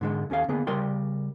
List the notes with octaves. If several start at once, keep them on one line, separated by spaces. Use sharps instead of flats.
G#2 D3 G#3
D#2 C#4 A4 F5
D3 A#3 B3 G#4
C#3 G3 A#4 D5 G5 C6